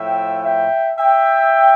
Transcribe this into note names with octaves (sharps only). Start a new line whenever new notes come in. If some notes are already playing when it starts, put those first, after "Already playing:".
Already playing: A2 F3 E5 G5
E5 G5
E5 G5